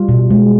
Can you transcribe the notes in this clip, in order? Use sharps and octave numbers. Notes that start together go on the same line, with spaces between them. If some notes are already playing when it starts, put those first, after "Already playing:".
Already playing: G3 F4
B2
G#3